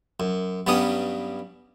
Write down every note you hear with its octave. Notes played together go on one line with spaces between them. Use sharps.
F#2
G2 F#3 G3 B3 C#4 D#6